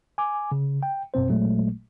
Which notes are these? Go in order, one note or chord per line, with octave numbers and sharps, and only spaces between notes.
G#5 D6
C#3
G5
G#1 F#2 B2 C4 C5
A1 A#2 F#3 G#3 A3